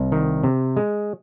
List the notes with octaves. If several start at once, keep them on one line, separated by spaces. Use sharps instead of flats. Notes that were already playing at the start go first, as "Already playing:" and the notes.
Already playing: C2
D#3
C3
G#3